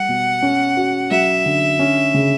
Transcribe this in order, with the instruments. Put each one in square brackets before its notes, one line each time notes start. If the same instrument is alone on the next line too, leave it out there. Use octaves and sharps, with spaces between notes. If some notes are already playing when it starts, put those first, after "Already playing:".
Already playing: [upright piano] G3 [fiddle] F#5
[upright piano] B2
C#4
F#4
[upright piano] F#3 [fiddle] E5
[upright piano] D3
C#4
C#3